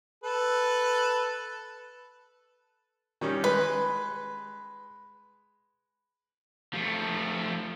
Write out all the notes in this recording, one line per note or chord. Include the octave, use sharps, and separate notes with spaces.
A4 B4
D#3 G3 C#4
G#3 B4
F3 A3